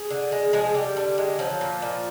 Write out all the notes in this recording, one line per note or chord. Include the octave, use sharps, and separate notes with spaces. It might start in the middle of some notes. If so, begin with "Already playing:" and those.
Already playing: G#4
D3
G#3
F3 G#3 G#4
D3 G3 G4
D3
G#3
F3 F#3 F4
A#2
A#2